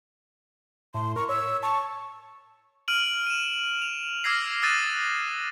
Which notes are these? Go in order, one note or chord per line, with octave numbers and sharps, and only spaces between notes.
A2 C6
A#4 C#6
C#5 E6
A5 C#6
F6 D7 D#7 F#7
D#7 E7
F7
D6 E6 F6 G#6 A#6 C7
D#6 E6 F#6 A6 D#7 E7
E6